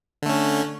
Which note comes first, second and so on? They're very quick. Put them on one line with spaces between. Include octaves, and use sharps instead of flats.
D3 A3 C#4